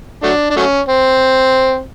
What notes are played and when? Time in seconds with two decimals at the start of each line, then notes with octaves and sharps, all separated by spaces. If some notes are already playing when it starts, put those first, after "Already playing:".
0.23 F#3 A3 D4
0.50 D4
0.56 F#3 A3 C#4
0.89 C4